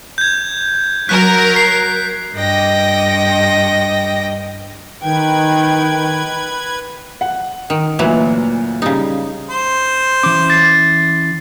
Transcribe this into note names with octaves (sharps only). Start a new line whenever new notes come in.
G6 G#6
F#3 A#4 F#6 B6
C7
G2 D#5 G5 A#6
D#3 B4 G5 G#6
F#5
D#3
D2 A#2 E3 F#3
C#3 G3 D#4
C5
E3 C#4 D6
A6 C7